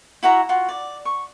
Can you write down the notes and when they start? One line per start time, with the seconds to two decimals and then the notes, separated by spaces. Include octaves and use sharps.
0.23 E4 F#4 E5 A#5
0.49 F4 F#4
0.69 D5
1.05 C#6